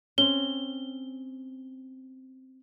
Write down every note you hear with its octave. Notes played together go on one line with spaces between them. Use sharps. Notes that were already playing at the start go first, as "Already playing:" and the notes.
C4 C#4 G7